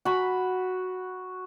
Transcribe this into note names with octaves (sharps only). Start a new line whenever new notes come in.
F#4 B5